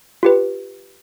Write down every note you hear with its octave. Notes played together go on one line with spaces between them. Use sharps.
F4 G4 B4